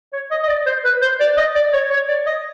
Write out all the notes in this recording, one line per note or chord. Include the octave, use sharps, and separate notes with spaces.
C#5
D#5
D#5
D5
C5
B4
C5
D5
D#5
D5
C#5
C#5
D5
D#5